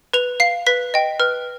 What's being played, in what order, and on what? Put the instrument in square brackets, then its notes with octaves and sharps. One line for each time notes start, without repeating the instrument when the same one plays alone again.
[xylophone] B4 F7
F5 C7
B4 B6
D#5 G5
B4 F6